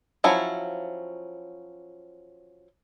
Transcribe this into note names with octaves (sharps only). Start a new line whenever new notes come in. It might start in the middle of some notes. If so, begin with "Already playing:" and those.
F3 F#3 C#4 E4